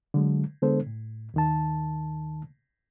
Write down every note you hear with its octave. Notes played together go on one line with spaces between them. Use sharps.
D3 F#3 G#3
D3 G#3 B3 D4 A4 C5
A2
D#2 D#3 A5